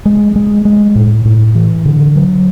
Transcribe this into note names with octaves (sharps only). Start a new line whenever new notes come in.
G#3
G#3
G#3
A2
A2
E3
D3
F#3